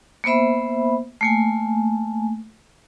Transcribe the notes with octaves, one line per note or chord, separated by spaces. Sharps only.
A#3 B3 C5 E5 B5
A3 A#3 G#5